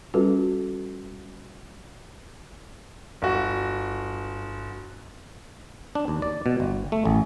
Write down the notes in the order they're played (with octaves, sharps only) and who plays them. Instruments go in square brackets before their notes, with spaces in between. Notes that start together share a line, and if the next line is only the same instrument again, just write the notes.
[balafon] G3 C#4 F4 F#4 A4 B4
[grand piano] G1 F#4
[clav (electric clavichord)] D4
D#2
D5
B2
G1
A3
A1